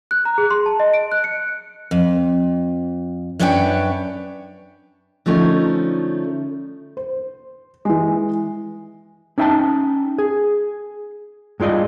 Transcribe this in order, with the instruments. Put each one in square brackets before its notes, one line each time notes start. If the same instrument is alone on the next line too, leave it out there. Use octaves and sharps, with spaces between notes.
[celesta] F#6
A#5
G#4
C6
A5
D#5
D7
F#6
C#7
[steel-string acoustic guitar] F2
F#2 C#4 D4 B4 C#5 G5
D3 F3 A3 C#4 D#4
[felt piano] C5
E3 G#3
[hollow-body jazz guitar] C#4 D#4 E5 F#5 G5 A5
G#4
G2 G#3 F4 D5 D#5